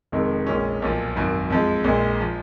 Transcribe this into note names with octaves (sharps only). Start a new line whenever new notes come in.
F1 F2 D#3 G#3
A#1 A#2 G#3 C#4
B1 A#2 F3
G#1 F#2 D#3
F2 F3 G#3
A#1 A#2 G#3
F3